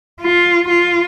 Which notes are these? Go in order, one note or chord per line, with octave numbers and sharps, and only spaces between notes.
F4
F4